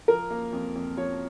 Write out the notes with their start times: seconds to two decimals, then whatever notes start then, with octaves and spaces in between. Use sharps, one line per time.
0.08 F3 A#4
0.30 A#3
0.53 F2
0.75 F2
0.97 F3 C#5